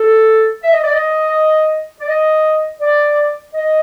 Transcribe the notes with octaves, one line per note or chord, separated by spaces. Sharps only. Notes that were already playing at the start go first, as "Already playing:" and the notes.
Already playing: A4
E5
D#5
D5
D#5
D5
D#5
D5
D#5